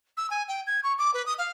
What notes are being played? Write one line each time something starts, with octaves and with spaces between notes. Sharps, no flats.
E6
G#5
G5
G#6
C#6
D6
B4
D#6
F5